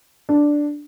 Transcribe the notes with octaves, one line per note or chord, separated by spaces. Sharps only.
D4